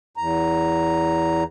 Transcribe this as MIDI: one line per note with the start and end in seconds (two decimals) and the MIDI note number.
0.17 1.43 40
0.17 1.43 82